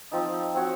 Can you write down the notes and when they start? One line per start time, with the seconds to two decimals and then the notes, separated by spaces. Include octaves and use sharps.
0.12 F3 C4 D#4
0.54 C4 F#4 C#5